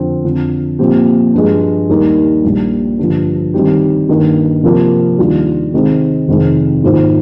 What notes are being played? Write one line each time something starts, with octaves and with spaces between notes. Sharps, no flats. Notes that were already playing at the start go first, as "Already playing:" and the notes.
Already playing: F2 D3 F3 C4
F2 D3 F3
A#2 F3 C4 G4
G2 F3 G#3
D#2 D#3 G3 A#3 D#4
A#1 A#2 G3
G2 D3 F3
D#3 G3 C4 D#4 G4
G2 D#3 A#3
C3 F3 A#3
D#2 D#3 G3 D4 F4
C3 D#3 G#3 C4
F1 F2 D#3 G#3 C4
G#2 D#3 A#3 F4 C5